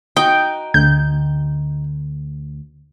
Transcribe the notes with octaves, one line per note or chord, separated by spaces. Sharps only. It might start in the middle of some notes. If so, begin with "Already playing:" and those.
D#4 F#4 G5
D2 G6